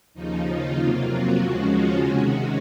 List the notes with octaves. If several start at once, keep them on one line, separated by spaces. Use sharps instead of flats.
D#2 C#3 F3 D#4
F4
F2 C3 F#3 A#3
F#4
D#2 C#3 F3 G#3 C#4
F4
C3 D#3 G#3 C#4 F#4